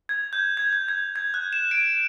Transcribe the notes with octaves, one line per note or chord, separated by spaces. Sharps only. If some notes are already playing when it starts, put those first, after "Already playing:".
G#6
G6
G#6
G#6
G#6
G#6
F#6
E7
D7